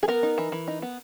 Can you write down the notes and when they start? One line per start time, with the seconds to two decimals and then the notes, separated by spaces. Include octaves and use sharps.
0.03 G#4
0.08 B3 A#4
0.23 D#4
0.38 E3
0.52 E3
0.67 D#4
0.82 B3